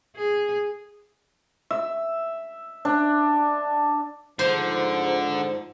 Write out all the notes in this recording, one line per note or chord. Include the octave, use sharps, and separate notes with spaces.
G#4
E5
D4
G#2 D3 F3 C5